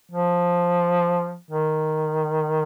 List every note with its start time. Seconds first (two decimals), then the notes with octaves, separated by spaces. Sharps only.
0.12 F3
1.51 D#3